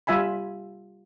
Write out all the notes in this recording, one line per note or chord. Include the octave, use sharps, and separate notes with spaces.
G3 F4 E5 G#5 B5